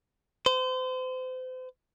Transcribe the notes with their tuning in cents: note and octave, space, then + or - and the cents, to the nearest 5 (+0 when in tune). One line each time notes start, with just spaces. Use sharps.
C5 -35